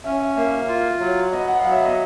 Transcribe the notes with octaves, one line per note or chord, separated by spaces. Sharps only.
C#4 E5
E5
A#3 E5
E5
F4
F#3
B3 D#5
F#5
F5
F#3
E5
D#5